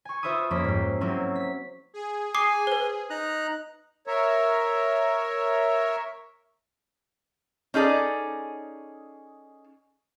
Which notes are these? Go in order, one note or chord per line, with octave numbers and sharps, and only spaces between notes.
G#5 C#6
F4 C5 E5 B5 D#6
F2 A#3 C#4 C5 D6 B6
G#2 G3
F#3 A#3 C4 C#4 E4
B6
G#4
G#5 D6 D#6 C7
B4 C5
D#4 A#5 F#6
A#4 C#5 E5
C#4 D#4 G#4 A4 D5